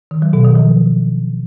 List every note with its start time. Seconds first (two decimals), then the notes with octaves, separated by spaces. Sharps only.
0.11 D#3
0.22 F#3
0.33 B2
0.44 D#3
0.55 F3